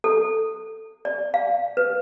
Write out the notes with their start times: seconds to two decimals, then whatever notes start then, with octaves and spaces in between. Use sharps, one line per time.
0.04 A4
1.05 D5
1.34 F5
1.77 B4